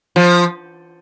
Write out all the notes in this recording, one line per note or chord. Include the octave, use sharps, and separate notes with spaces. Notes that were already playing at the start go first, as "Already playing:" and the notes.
F3